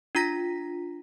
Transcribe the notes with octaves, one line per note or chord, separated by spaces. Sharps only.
D4 F4 A#5 A#6 B6